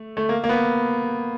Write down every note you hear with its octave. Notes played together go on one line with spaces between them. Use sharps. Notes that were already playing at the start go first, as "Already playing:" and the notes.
Already playing: A3
A3
A#3
A#3
B3